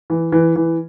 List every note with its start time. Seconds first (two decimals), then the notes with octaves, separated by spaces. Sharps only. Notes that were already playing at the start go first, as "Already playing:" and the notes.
0.10 E3
0.32 E3
0.56 E3